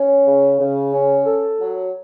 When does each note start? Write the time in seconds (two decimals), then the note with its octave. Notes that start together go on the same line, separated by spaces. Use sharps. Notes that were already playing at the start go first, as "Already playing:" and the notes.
Already playing: C#4
0.26 C#3
0.59 C#3
0.93 C#4
1.25 A4
1.59 F#3